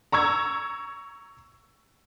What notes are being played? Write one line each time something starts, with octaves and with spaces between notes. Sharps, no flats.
A#5 C#6 E6 G#6